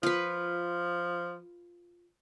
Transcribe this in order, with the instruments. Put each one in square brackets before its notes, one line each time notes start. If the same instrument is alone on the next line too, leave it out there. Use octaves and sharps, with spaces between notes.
[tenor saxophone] F3 [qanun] F4 B4